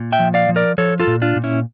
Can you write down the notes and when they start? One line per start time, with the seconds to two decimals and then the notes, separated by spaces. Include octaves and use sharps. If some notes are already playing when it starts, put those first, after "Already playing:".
Already playing: A#2
0.12 E5 G5
0.19 F3
0.34 D5 F5
0.49 F3
0.56 A#4 D5
0.78 F3 A4 C#5
1.00 F4 A4
1.07 A#2
1.22 D4 F4
1.36 A#2
1.44 C#4 E4